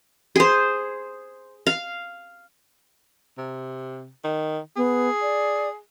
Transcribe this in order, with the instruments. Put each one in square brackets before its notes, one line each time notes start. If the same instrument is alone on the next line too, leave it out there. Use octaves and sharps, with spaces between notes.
[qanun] G#4 C5
F5
[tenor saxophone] C3
D#3
[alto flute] B3 [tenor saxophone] G#4
[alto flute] D5